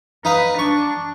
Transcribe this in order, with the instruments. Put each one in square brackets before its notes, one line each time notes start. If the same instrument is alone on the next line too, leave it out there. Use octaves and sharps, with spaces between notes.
[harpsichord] D#4 F5 [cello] B4
[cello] D4 [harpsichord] C#6